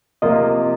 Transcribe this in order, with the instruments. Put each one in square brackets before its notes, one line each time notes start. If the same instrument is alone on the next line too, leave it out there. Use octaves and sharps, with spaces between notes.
[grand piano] C3 F3 A#3 F4 A#4 [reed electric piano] D#5